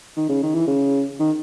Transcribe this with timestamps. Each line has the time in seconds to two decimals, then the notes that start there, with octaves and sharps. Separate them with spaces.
0.16 D#3
0.29 C#3
0.43 D#3
0.54 E3
0.67 C#3
1.19 D#3